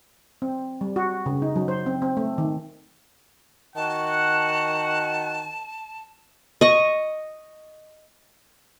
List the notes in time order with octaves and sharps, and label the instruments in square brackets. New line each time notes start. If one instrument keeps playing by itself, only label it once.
[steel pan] C4
G3
F#4
C#3
D#4
F#3
C5
C4
C4
A3
D#3
[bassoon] D#3 [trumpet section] F#4 F#5 [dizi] A5
[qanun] D#5 C#6